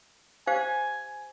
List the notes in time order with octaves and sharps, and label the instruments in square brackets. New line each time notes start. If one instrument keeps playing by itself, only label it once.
[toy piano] G4 C5 F5 [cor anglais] G#5